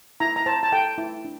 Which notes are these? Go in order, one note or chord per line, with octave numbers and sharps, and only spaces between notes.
E4 A#5
A#5
C5 A5
A5
A4 G5
E4
D4